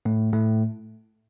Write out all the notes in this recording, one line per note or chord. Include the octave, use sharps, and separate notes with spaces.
A2 A3
A2 A3